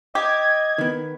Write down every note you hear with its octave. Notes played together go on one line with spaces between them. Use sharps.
G4 D#5 G#6
D#3 B3